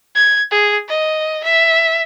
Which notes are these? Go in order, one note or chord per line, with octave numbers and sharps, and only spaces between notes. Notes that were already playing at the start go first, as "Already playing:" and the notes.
G#6
G#4
D#5
E5